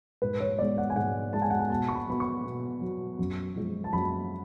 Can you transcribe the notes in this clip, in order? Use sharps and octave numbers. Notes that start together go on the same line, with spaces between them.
G#2 B4
C#5
G#3 B3 D5
F#5
G#5
G#2 F#5
G#3 B3 A5
G#5
F#5
G#5
B2 A5
C#6
B5
F#3 B3 B5
C#6
B2
F#3 B3
F#2
F3 G#3
A5
F#2 B5